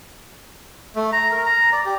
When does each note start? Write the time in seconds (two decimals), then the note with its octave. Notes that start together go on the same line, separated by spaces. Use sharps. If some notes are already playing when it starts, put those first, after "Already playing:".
0.96 A3
1.13 A#5
1.32 A#4
1.46 A#5
1.73 D5
1.85 G4